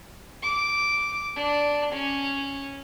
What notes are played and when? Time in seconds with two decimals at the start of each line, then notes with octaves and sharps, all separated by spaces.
0.43 D6
1.37 D4
1.93 C#4